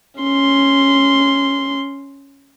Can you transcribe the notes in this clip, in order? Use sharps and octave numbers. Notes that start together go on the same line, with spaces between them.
C#4 C6